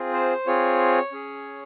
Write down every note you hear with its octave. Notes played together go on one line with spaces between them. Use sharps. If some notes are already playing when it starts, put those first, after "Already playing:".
Already playing: C4 F4 G#4
C5
C4 F4 G#4 C#5
C#4 G#4